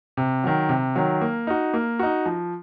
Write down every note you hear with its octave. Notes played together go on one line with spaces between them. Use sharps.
C3
D#3 F#3
C3
D#3 F#3
A#3
D#4 F#4
A#3
D#4 F#4
F3